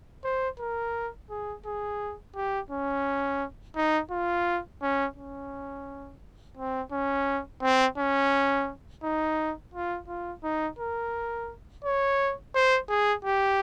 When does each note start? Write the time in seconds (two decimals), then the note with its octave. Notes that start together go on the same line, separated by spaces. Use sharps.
0.24 C5
0.60 A#4
1.30 G#4
1.66 G#4
2.36 G4
2.71 C#4
3.76 D#4
4.11 F4
4.82 C#4
5.17 C#4
6.57 C4
6.92 C#4
7.62 C4
7.98 C#4
9.03 D#4
9.74 F4
10.08 F4
10.44 D#4
10.79 A#4
11.85 C#5
12.55 C5
12.90 G#4
13.25 G4